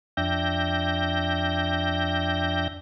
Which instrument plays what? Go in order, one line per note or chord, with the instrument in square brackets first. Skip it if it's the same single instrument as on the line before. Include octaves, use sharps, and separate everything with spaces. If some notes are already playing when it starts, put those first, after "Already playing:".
[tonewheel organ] F2 D4 E5 G5 G6 A#6